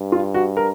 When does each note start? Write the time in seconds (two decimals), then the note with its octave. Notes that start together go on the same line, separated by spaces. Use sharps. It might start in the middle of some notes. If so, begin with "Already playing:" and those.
Already playing: G2
0.12 F4
0.34 F#4
0.57 A#4